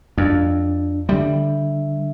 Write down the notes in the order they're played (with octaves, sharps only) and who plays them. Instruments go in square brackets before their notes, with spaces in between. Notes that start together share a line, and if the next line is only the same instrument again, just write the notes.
[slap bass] F2 [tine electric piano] D4
[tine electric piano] D3 D4 E5 [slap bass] G3